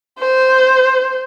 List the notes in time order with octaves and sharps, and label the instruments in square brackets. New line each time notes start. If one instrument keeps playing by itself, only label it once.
[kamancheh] C5